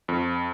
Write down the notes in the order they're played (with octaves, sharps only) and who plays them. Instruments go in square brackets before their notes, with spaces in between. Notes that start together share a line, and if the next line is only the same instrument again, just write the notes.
[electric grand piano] F2